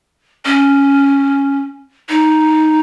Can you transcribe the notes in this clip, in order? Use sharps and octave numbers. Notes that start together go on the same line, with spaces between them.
C#4
D#4